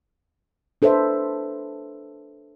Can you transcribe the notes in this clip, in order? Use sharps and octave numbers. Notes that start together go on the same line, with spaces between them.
D4 A4 B4 C5 E5